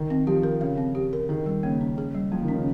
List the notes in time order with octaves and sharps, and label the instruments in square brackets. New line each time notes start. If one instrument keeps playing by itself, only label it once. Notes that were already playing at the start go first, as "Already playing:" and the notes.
Already playing: [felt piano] D#3
[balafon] C4
[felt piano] F3 [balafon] G4
[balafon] A#4
[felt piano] C#3 [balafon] F5
[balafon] C4
G4
A#4
[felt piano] D#3 [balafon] G#4
[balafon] G3
[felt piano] C#3 [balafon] A#3
[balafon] C#4
G#4
G3
[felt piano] F3 [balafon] A#3
[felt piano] D#3
[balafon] C#4
[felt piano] C#3